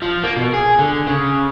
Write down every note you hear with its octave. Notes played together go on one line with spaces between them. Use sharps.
F3
A#3
B2
G#4
D3
C#3